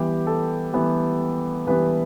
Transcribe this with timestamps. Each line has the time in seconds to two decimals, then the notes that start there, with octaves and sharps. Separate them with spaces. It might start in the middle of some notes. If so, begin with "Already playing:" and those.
Already playing: E3 G3 B3 G4
0.27 A4
0.73 E3 G3 B3
1.67 E3 G3 B3 B4